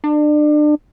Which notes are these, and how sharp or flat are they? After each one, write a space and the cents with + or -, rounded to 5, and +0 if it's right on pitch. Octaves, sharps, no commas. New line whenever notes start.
D4 +30